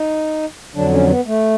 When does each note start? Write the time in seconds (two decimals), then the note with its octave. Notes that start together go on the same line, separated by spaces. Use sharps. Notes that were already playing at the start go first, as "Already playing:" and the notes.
Already playing: D#4
0.75 F2 D3 F#3 D4
0.93 C#4
1.09 B3
1.27 A3